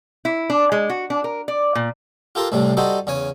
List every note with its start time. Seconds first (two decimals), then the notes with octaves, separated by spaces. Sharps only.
0.25 E4
0.50 D4
0.72 G#3
0.90 F#4
1.10 D4
1.24 A#4
1.48 D5
1.75 A#2
2.35 F4 G4 A4 A#4 C6
2.52 C2 A2 C3 G3 A3
2.77 G3 D#4 F#4 A4 C5
3.07 E2 C#3 C#5 G#5